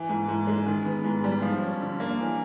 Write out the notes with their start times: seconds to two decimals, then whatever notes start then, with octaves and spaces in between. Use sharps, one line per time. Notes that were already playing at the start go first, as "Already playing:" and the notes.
Already playing: E3
0.09 G#2
0.29 G#2
0.47 G#3
0.67 D#3
0.85 B3
1.04 G#2
1.24 G3
1.42 F3
1.62 C#4
1.81 D3
2.00 A#3
2.19 E3